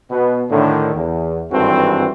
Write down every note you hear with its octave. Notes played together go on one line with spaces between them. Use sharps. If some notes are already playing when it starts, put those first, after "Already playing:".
B2 B3
A2 D3 D#3
E2
G#1 G2 E3 C4 F#4 A4